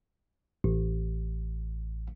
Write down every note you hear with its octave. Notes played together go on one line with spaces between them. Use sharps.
A1